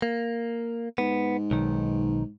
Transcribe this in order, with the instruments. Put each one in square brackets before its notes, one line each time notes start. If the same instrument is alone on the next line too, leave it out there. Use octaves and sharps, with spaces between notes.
[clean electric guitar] A#3
[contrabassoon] G#2 [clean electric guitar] B3
[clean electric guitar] B1 D#3